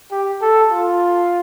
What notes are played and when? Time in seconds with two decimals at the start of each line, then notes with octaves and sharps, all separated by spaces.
0.11 G4
0.42 A4
0.71 F4